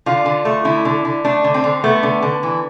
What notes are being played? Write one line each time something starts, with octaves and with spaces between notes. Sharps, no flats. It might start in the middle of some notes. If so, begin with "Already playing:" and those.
D3 F4
D3
A3
D3 E4
D3
D3
A3 D4
D3
C4
D3
A3 B3
D3
D3
E3